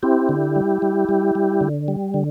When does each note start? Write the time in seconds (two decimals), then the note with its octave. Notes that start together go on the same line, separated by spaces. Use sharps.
0.03 C4 E4 G4
0.29 D3
0.56 G3
0.82 G3
1.09 G3
1.35 G3
1.61 D3
1.88 G3
2.14 D3